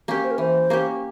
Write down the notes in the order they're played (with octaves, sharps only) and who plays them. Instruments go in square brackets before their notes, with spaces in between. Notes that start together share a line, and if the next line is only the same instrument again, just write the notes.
[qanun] A#3 C#4 G4 [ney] A#4
[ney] C5
A#4
[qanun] E3 [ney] C5
[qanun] A#3 C#4 G4